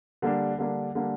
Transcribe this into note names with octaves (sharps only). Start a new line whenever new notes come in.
D3 G3 A#3 D4
D3 G3 A#3 D4
D3 G3 A#3 D4